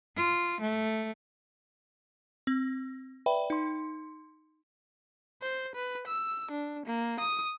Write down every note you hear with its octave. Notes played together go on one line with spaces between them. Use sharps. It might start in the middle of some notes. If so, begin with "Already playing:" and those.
F4
A3
C4
B4 D5 E5 G5 B5
D#4 C6
C5
B4
E6
D4
A#3
D#6